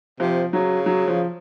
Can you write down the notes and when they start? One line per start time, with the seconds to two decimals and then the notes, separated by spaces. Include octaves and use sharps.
0.20 C3 F3
0.53 C#3 F#3
0.86 F#3
1.08 F3